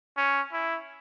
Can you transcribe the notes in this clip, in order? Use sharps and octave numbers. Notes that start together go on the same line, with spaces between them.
C#4
E4